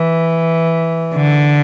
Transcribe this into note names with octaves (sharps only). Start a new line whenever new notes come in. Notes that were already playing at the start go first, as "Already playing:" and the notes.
Already playing: E3
D3